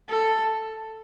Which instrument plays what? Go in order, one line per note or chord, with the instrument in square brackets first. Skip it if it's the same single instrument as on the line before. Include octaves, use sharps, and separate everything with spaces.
[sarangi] A4